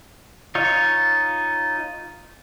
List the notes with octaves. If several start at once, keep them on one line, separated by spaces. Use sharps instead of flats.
D#4 F4 C#5